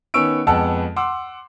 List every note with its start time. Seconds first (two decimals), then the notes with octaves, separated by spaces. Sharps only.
0.14 D#3 B3 C#4 C#6 E6 D7
0.47 F2 G#3 B3 F#5 A5 E6
0.96 F#5 C6 D6 E6